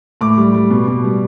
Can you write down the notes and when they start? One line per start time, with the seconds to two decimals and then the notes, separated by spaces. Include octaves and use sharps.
0.21 A2 D6
0.38 G3
0.54 G3
0.70 B2
0.87 B2
1.04 G3